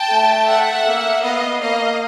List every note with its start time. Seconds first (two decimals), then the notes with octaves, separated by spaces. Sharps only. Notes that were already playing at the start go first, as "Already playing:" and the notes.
Already playing: G5 A5
0.10 A3
0.48 E5 F#5
0.86 A#3
1.23 B3 D#5 F5
1.61 A#3 D#5 F5